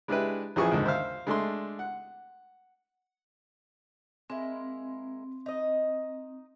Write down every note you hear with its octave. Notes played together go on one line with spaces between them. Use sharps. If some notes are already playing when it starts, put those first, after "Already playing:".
G#3 D4 E4 G4 B4
A1 E3 F3 G#4 C#6
D#2 G#2 D3
C5 E5 F5
G#3 A3 D4 C6
F#5
G#3 A#3 C4 E4
D#4 D#5